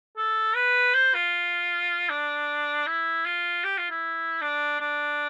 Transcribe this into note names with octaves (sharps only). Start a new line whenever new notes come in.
A4
B4
C5
F4
D4
E4
F4
G4
F4
E4
D4
D4